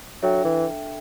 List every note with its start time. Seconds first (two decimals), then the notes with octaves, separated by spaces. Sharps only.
0.22 F#3 D4 A4 E5 G5
0.44 E3